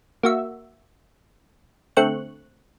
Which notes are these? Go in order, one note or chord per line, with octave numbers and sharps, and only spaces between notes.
A#3 F#4 E5
D3 A3 C4 C#6 F#6